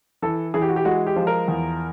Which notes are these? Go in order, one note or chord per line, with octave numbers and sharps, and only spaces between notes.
E3 A4
E3 G#4
G4
F#4
G4
G#3 F#4
G4
F3
A#4
E2